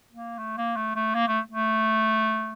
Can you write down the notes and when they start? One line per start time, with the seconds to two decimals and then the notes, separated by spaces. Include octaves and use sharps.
0.12 A#3
0.38 A3
0.57 A#3
0.76 A3
0.95 A3
1.14 A#3
1.28 A3
1.51 A3